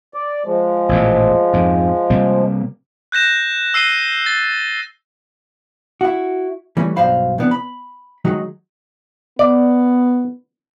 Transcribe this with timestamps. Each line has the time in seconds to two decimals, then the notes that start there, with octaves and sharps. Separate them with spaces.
0.14 D5
0.45 F3 G#3
0.89 A1 E2 A#2
1.53 F2 G#2
2.10 C3 G3 A#3
3.12 F#6 G6 A#6 E7
3.74 E6 C7 D#7 G7
4.26 A6
6.01 E4 F#4
6.77 E3 G3 A3 C#4
6.96 B1 G2 F#3 C5 F5 B5
7.38 C3 E3 B3 D4
7.51 B5
8.25 D#3 F#3 G#3 D#4
9.39 B3 D5